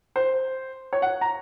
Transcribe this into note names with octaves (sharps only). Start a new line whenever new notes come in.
C5
C#5
F#5
A#5